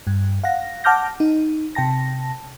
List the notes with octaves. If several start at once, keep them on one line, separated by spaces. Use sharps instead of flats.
G2
F5 F#5 A#6
F#5 A5 D6 F6 G6 A#6
D#4
C3 G5 A5 A#6